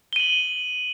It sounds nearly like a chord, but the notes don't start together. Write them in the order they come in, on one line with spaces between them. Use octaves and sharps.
G7 D#7 F#7